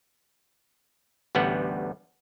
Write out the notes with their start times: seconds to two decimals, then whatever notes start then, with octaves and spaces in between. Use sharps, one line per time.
1.35 A1 D2 G3 B3 F#5